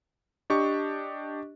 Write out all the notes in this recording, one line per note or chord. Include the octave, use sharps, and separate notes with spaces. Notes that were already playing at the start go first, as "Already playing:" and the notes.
D4 G4 D#5 C#6